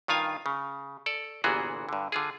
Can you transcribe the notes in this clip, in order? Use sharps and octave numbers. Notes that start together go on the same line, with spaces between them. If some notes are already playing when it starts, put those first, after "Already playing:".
G2 D#3 F4 F5 G#5
C#3
A4 D5
G1 A#2 E3 B3 F#4 G#4
G2 D3
D3 F4 G#4